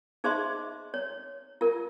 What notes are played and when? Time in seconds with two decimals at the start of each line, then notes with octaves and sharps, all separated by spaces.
0.24 D#4 G#4 C5 D#5 E5 C6
0.94 C#5
1.61 F4 A#4